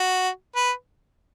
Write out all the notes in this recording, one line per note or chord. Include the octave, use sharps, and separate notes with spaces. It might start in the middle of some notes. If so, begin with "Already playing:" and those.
Already playing: F#4
B4